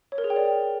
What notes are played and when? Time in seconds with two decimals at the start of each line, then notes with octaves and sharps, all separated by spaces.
0.12 C#5
0.18 A#4
0.24 G#4
0.30 G5
0.36 D5